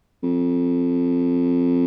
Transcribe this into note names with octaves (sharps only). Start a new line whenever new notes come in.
F2